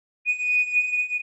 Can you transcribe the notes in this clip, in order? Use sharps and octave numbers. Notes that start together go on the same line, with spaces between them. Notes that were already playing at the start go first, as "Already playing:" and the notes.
D#7